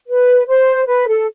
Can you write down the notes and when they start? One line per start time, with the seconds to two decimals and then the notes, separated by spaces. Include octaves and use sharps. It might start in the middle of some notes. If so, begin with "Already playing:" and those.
0.08 B4
0.47 C5
0.87 B4
1.08 A4